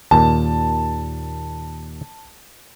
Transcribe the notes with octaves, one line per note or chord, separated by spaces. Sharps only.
D#2 A#2 A5